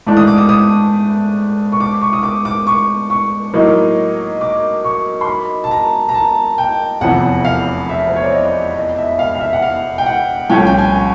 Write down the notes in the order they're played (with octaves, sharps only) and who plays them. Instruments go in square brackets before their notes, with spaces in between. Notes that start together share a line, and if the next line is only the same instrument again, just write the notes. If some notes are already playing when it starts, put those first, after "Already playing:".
[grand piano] G#2 E3 A3 D4
[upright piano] D#6
D6
D#6
D#6
C#6
D6
C#6
D#6
D6
D6
C#6
C#6
[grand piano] A2 F#3 A#3 D#4
[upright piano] D6
C#6
C6
B5
A5
A#5
A#5
A5
G5
[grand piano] F1 E2 C3 F3 [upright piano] F#5
[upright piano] F5
E5
C5
C#5
D5
D#5
D#5
E5
F5
F5
E5
F#5
F5
G5
F#5
[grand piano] C2 A#2 F3 A3 C#4 [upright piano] G5
[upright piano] G5
G#5